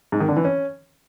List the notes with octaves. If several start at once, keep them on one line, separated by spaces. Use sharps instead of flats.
G#2
D#3
D3
E3
C#4